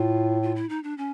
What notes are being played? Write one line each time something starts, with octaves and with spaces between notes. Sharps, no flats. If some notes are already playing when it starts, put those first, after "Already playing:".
Already playing: A2 F4
F4
E4
D#4
D4
C#4